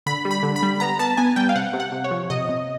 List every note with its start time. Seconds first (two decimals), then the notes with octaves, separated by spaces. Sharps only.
0.06 D3 B5
0.25 G3
0.31 B5
0.43 D3
0.56 B5
0.63 G3
0.80 B3 A#5
0.99 B3 A5
1.17 B3 G#5
1.36 G3 G5
1.49 F5
1.55 C3 F#5
1.73 C3
1.80 F#5
1.92 C3
2.04 C#5
2.11 F3
2.30 C3 D#5
2.49 C3